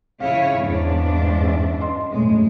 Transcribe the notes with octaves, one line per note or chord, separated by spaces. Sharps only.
C#3 E4 C#5 F5
E2 G#2 D4
C#4 E5
D#5 C6
F#2 A2 G#3